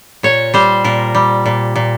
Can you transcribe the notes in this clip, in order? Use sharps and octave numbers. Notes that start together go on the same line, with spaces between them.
A#2 C#5
G3 C5
A#2 A#4
G3
A#2
A#2